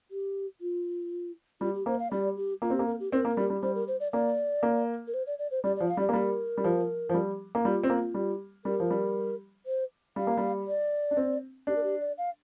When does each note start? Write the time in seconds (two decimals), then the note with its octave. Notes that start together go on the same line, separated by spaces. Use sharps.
0.11 G4
0.61 F4
1.61 G3 F4
1.74 G4
1.86 A#3 C5
1.99 F5
2.11 G3 D5
2.36 G4
2.62 A#3 F4
2.70 C4
2.74 G4
2.79 A#3
2.87 A#4
3.00 G4
3.12 C4 A#4
3.25 A#3
3.37 G3
3.50 G3
3.63 G3 C5
3.75 A#4
3.88 C5
4.00 D5
4.12 A#3 D5
4.63 A#3
5.07 A#4
5.14 C5
5.26 D5
5.39 D5
5.51 C5
5.64 G3 D5
5.76 D5
5.80 F3
5.88 F5
5.97 G3
6.01 D5
6.09 A#3
6.13 G3 A#4
6.58 G3
6.64 F3
7.09 F3
7.14 G3
7.55 A#3
7.64 G3 F4
7.84 C4
7.90 A#3
8.14 G3
8.65 G3 A#4
8.80 F3
8.90 G3
9.66 C5
10.16 G3 F5
10.27 A#3
10.37 G3
10.67 D5
11.11 D4
11.17 C4
11.67 D4 G4
11.76 A#4
11.83 G4
12.00 D5
12.18 F5